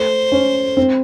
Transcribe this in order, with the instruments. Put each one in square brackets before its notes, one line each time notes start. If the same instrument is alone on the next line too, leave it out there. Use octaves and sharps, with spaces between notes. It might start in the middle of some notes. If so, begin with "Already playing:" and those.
Already playing: [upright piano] A3 [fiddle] C5
[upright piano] C#4
C4